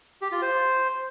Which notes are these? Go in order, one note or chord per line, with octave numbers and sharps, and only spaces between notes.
G4
F4
C5